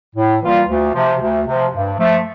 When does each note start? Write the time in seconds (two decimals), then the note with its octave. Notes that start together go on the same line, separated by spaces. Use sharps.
0.16 A2
0.42 E3 G3 A#3 F4
0.69 D2
0.94 C3 F3
1.21 D2
1.47 C3 F3
1.73 G2
1.98 F3 A3